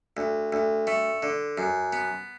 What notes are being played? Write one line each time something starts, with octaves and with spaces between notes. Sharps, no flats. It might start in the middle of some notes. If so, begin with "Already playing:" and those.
D2
D2
A3
D3
F#2
B3